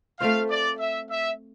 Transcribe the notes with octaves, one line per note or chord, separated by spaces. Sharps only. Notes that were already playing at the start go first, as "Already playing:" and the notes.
A3 C4 F4 C5 F5
D5
E5
E5